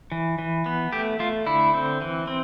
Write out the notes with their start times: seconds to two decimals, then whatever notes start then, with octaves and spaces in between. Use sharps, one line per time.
0.12 E3
0.39 E3
0.66 B3
0.93 A3 G4
1.19 A3 F4
1.46 D3 E4
1.74 C4
2.01 E3
2.27 C4